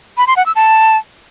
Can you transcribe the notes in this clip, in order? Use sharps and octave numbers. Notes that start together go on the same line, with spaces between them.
B5
C6
F#5
E6
A5